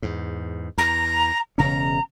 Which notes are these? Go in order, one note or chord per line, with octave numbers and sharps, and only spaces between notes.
E2 G#2
E2 A#5
E1 C#3 C#4 A#5